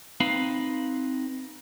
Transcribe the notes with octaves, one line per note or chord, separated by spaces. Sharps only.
C4 D#4 B4 F5 B5